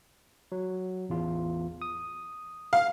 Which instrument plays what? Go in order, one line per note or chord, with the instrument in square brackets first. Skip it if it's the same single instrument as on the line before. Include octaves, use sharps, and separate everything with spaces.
[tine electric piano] F#3
A1 E2 F4
D#6
[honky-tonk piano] F5